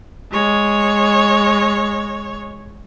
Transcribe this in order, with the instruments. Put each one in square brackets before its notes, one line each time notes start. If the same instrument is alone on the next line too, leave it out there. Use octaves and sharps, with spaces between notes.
[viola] G#3 C#5